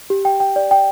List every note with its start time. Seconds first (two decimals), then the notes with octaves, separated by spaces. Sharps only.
0.10 G4
0.25 G5
0.40 G5
0.56 D5
0.71 G5